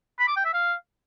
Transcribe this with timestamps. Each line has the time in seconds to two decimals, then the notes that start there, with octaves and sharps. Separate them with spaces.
0.19 B5
0.28 D6
0.36 G5
0.45 E5
0.53 F5